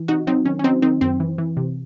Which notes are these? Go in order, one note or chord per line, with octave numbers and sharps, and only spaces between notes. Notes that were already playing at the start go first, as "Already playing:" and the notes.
Already playing: E3
C3 D#4 F#4
F#3 C4 D#4
D#3 C#4
C#4
F#3 C4 D#4
D#3 C4 D#4
F#2 C4
E3
E3
C3